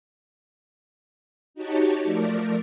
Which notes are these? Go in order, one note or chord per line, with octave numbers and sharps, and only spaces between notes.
D#4 F#4 G4 C#5 A5
F3 A3 A#4 D5